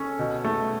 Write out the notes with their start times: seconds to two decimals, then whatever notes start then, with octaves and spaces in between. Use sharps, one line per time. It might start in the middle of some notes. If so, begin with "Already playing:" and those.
Already playing: C#4 A4 C#5
0.19 B2
0.45 A3